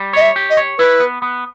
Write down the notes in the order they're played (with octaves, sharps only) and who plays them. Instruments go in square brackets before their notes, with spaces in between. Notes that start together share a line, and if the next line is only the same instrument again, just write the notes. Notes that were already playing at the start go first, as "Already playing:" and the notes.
Already playing: [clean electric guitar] G3
[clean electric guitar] C#5 [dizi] D#5
[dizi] E5
[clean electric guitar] G4
[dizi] D#5
[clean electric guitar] C#5
[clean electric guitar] E4 [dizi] B4
[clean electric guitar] B3
B3